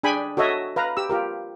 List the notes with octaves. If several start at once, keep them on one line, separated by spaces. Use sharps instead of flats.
D4 G#4 G5 G#5 B5
F#4 A4 C#5 D#5 E5
B4 F5 A#5
G4 E6
F4 G4 A#4